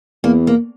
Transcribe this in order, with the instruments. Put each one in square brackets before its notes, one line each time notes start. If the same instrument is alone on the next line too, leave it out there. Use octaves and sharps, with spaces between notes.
[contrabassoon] E2 [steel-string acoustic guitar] A#3
[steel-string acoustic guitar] A#3